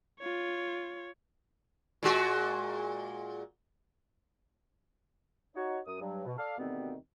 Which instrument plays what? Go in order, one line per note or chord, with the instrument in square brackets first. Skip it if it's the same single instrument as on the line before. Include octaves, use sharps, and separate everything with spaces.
[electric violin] F4 C#5
[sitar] A#2 G#3 F#4
[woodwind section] D#4 F#4 C#5
F#2 D#6
G2 F#3
B2
A4 D5 F5
D2 B2 D#3 G3 B3 C4